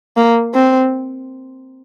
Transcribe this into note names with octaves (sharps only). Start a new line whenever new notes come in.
A#3
C4